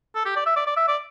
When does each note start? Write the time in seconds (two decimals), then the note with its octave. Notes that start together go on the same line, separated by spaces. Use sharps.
0.15 A4
0.26 G4
0.36 D5
0.46 E5
0.56 D5
0.67 D5
0.77 E5
0.88 D5